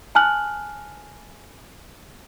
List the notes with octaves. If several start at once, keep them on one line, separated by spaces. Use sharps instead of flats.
G#5 A5 F6 F#6 F#7